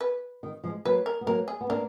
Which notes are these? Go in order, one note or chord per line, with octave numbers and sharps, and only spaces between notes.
B4
D#3
F3 G#3
F#3 A#3 B4
A#4
B3
F#3 A#3 A#4
G#4
B3
A#3 D4 A#4